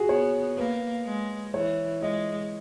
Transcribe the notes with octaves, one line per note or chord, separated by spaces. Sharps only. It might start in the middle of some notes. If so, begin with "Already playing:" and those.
Already playing: F#4 G#4
B3 C#5
A#3 B4
G#3
E3 C#5
G#3 D#5